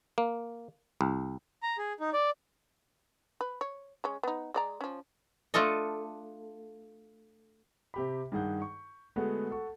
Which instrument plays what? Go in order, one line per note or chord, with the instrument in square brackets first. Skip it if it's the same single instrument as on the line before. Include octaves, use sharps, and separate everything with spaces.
[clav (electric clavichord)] A#3
C2
[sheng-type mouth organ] A#5
G#4
D#4
D5
[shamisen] B4
C#5
G#3 C#4
B3 D#4
G#3 D5 A#5
F3 C#4
[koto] A3 D4 F4 A4 D#5
[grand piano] C3 G4 B5
G2 D#3 G#4 F#5 G6
C#6
D3 G#3 A3 B3 F#4 G#4
A4 F#5 C#6